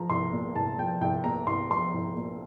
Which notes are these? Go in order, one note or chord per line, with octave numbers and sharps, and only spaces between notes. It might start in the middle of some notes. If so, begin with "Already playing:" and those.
Already playing: F3 A#5
C2 C6
A#2
C2 A5
F3 G5
C2 G5
A#2 A#5
C2 C6
F3 C6
C2
A#2